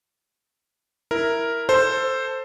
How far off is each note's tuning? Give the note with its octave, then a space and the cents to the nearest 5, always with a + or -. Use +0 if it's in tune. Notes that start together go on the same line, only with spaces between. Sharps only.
E4 +0 A#4 +0
A4 +10 C5 +0